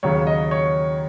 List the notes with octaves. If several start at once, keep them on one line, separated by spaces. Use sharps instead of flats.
D#2 C#3 F#3 C#5
D#5
C#5